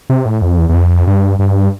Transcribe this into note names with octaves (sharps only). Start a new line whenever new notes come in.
C3
A2
F2
E2
E2
F2
G2
G2